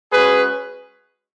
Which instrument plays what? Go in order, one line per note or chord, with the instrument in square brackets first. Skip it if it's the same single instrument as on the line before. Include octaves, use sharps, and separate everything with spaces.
[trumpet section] G#3 C#4 F#4 G#4 B4